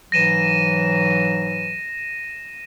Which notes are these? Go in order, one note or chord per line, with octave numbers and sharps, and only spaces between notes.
G#2 E3 F#3 A#6 D#7 E7